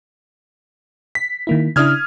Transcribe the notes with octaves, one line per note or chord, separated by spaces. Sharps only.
B6
D#3 A#3 E4
C#3 D4 E4 D#6 F6 G#6